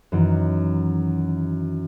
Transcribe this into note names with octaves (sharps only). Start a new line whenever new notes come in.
F#2 D#3 E3